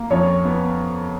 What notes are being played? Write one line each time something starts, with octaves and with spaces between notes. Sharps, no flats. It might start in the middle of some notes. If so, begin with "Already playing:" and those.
Already playing: A#3
F2 C#4 C#5
B3